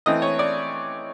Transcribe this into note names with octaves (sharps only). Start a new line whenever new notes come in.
E3 A3 C4 D#5
C#5
D5